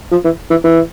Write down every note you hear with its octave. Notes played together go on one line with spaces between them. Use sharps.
F3
E3
E3
E3